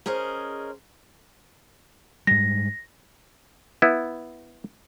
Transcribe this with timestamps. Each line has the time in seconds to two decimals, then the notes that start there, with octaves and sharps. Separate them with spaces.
0.06 C#4 G#4 A#4 C5 D#5
2.27 G#2 G3 A#6
3.82 B3 E4